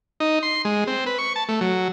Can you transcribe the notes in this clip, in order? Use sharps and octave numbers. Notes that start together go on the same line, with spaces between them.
D#4
C6
G#3
C4
B4
C#6
A5
A3
F#3